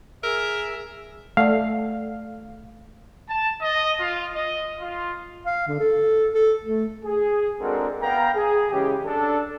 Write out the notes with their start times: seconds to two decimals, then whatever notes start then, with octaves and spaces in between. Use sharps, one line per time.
0.23 G#4 A#4 E5
1.37 A3 A4 D5 F5 F#5
3.27 A5
3.61 D#5
4.00 F4
4.34 D#5
4.78 F4
5.46 F5
5.68 D3
5.80 A4
6.34 A4
6.64 A3
7.05 G#4
7.60 G#3 C4 D4 F#4 A4 A#4
8.01 B3 F5 G5 A#5
8.35 G#4
8.72 C#3 E3 G#3 C#4 G4
9.06 D4 A4